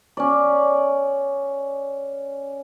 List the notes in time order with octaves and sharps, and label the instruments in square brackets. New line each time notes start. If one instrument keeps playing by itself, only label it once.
[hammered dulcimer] C#4 D5